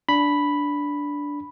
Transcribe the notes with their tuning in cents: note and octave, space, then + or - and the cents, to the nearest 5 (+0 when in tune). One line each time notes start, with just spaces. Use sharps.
D4 -10 B5 +0